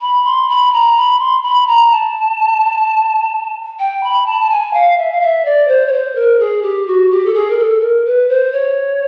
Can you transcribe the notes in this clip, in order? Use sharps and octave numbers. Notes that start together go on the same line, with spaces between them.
B5
C6
B5
A#5
B5
C6
B5
A#5
A5
G5
B5
A5
A5
G#5
F5
E5
F5
E5
D5
C5
C#5
C5
A#4
G#4
G4
F#4
G4
A4
G#4
A#4
A4
A#4
B4
C5
C#5